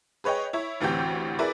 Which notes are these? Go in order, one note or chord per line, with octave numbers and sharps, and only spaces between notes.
G#4 B4 C#5 D#5 G5
E4 C#5
A1 D2 E3 C4 G4 G6
E4 G#4 A#4 B4 D5